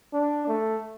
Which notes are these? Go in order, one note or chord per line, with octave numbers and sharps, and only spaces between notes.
D4
A3